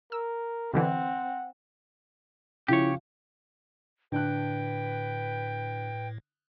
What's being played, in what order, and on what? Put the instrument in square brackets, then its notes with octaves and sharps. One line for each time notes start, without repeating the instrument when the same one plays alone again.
[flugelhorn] A#4 [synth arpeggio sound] E6
[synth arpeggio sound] B2 D3 E3 [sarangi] C4 [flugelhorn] F#5
[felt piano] C#3 F3 [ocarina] E4 [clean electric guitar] G4 C#5
[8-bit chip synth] A2 [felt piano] D3 D4 F#6 [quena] B4 [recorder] G5